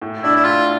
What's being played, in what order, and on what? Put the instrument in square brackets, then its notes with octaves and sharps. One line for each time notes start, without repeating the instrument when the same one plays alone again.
[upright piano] A2
[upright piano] D4 [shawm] E4
[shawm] E4
[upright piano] A2 [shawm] F4